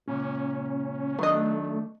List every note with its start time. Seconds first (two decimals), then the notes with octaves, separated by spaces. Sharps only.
0.08 C#2 F#2 A#2 C#4
1.19 D#3 F#3 A3 B3 D4 D#5